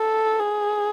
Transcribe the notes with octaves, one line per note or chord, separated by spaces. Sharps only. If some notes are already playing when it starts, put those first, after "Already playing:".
Already playing: A4
G#4